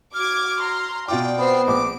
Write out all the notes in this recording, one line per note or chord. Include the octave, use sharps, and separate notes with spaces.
F#4 D6 F6 G#6
A#5 C6
B2 F4 D5 G5 D6
B3 C4 C5 C7
A#1 D6 D7